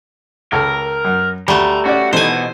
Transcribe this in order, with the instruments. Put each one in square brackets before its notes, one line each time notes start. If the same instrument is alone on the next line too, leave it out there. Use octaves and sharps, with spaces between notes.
[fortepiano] C#2 A4 [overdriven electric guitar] A#4
[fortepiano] F#2
[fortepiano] D2 [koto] G3 A3 [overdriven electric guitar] A#5
[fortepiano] C#4 D5 [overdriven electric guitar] F#4
[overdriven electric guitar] B2 [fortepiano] E3 D#4 A4 [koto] C5 G#5